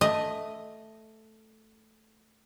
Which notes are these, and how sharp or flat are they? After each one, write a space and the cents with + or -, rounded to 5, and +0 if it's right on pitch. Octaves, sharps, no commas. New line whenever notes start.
A3 +0 D#5 +0